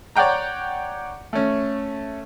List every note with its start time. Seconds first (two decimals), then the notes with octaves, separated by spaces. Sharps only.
0.16 C#5 D5 F#5 G5 A#5
1.33 A3 C#4